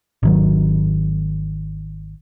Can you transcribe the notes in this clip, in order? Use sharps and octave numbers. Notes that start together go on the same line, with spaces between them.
G#1 D#3 F#3